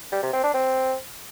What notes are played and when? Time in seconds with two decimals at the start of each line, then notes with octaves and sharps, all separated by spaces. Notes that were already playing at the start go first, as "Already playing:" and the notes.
0.12 G3
0.23 C3
0.33 C4
0.44 D4
0.54 C4